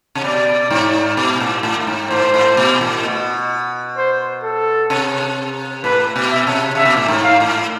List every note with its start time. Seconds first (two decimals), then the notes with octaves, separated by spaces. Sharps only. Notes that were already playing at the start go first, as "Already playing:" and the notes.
0.15 C3
0.24 B2 D5
0.70 G#2
1.17 B2
1.40 A2
1.63 A2
1.80 A2
1.87 G#2
2.10 A2 C5
2.34 A2
2.57 B2
2.81 A2
3.03 B2
3.97 C5
4.43 A4
4.90 C3
5.84 A2 B4
6.16 B2
6.31 E5
6.47 C3
6.75 C3 E5
6.85 B2
6.97 A2
7.08 G#2
7.24 F5
7.40 A2